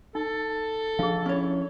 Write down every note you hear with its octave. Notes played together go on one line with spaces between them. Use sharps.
D#4 A4
F3 D4 G#4 F5
C#4 E4 C#5